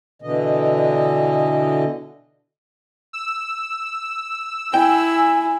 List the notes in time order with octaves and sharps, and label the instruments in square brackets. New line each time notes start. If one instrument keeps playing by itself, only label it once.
[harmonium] B2 D3 E3 D#5
[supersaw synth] E6
[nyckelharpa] E4 [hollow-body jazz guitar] G5 [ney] G#5